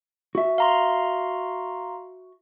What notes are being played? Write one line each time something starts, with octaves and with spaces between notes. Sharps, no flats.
F#4 E5
F5 A#5 C6